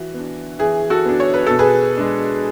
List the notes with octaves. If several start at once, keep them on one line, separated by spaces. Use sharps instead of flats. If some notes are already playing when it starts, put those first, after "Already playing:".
Already playing: E3 F#4
B3 D4
E3 G#4
F#4 A4
B3 D4
C#5
B4
B2 A4
G#4 B4
G#3 D4